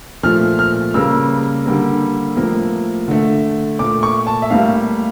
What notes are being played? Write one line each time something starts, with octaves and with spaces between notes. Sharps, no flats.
A#2 F3 A3 F6
F6
C#3 G3 A#3 E6
D3 G3 A#3
A2 F3 A#3
D3 A3
A#2 A3 D6
C#6
A5
E5
A2 G3 A#3 F5